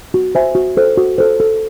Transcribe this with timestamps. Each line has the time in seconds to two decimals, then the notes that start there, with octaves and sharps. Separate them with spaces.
0.14 F#4
0.35 C5 E5 G#5
0.55 F#4
0.77 A4 C5
0.97 F#4
1.18 A4 C5
1.40 A4